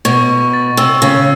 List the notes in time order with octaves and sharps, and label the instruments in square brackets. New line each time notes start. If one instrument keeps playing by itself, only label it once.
[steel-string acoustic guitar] B2 [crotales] C#6
[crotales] C#6
A6
[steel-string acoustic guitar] C3 [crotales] E6
[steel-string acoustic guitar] C#3 [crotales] C#6